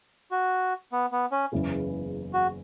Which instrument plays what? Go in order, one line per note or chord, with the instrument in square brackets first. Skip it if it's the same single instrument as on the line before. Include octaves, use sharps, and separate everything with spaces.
[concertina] F#4
B3
B3
C#4
[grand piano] F#1 E2 C#3 E3 B3
[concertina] F#4